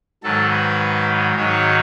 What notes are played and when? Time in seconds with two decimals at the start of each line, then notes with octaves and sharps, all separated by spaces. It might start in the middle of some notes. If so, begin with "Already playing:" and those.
0.23 G#2 D#3 F#3 A4
0.51 B4
1.36 G#2 D#3 F#3 C#5